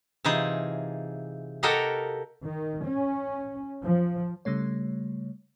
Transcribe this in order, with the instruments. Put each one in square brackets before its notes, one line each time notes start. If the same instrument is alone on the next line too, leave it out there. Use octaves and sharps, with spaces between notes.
[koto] C3 E3 D#4 F4 G#4
F#4 G4 A4 A#4 D#5 F5
[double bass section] D#3
C#4
F3
[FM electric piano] C#3 G3 A3 C#5